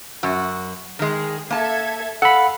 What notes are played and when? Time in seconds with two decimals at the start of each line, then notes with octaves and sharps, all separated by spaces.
0.23 F#2 F#4
0.99 D#3 G#3 G#4
1.50 A#3 A4 E5 A5 G#6
2.22 A4 F5 F#5 B5